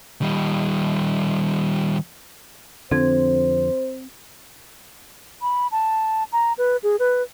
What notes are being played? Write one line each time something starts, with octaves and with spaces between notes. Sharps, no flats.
D#3 G3
F2 D3 F3 C4 C5 G#6
B5
A5
A#5
B4
G#4
B4